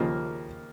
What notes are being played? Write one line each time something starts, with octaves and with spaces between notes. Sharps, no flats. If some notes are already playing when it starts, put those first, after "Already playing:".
Already playing: D#2 C#3 F3 A#3